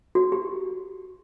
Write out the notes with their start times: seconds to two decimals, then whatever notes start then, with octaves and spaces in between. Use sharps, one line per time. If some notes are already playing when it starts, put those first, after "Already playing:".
0.15 F#4
0.32 G4